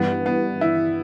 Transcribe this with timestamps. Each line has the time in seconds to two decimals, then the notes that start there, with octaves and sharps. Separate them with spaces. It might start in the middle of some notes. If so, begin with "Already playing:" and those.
Already playing: G2 E3 G3 B3
0.26 B3
0.61 E4